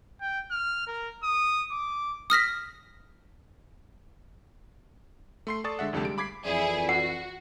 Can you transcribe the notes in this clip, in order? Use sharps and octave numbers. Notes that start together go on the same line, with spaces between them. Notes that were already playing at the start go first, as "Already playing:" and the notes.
G5
F6
A#4
D#6
D6
D#6 F6 A#6 B6
A3 C6 C7
A4 D5 A5 C#6 D#6 A6
D3 G#3 E5 F#5
C2 F2 D3 A3 G4 A5
G3 G#3 D7
B5 D6 G#6 B6 C7
F2 E3 E4 G#4 D5
F#4 F#5